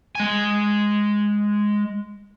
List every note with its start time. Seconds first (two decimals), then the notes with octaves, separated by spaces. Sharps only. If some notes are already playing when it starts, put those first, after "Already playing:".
0.15 G#3 G#5